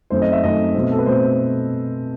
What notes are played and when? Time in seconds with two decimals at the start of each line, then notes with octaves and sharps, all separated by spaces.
0.10 F#2 D#3 A3 C4 C5
0.22 D#5
0.32 E5
0.43 F#2 D#3 A3 C4 D#5
0.75 B2 A3 C4
0.92 A4
0.99 B4
1.06 B2 A3 C4 C5